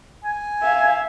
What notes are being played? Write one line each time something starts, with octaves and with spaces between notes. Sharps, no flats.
G#5
E5 F5